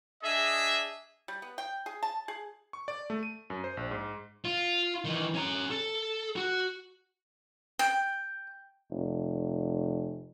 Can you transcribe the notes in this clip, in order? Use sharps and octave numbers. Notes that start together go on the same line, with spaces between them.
D4 G#4 D#5 E5
G3
B3
G5
G#4
A5
G#4
C#6
D5
A3
D#7
F#2
C5
A#1
G#2
F4
D#3 E3
C#4 A#5
A4
F#4
G5
F1